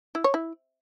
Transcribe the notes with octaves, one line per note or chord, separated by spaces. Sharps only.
E4
C#5
E4